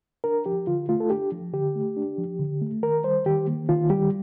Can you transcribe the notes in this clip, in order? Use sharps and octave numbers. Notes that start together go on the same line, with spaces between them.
D4 A#4
F3 G4
D3 F4
A3 F4
A4
D4 G4
F3
D3 G4
A3
D4
F3
D3
A3
D#3 A#4
G3 C5
D#3 G4
A#3
D#3 F4
G3 G4